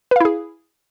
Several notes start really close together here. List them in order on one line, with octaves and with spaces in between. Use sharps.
B4 F5 E4 G#4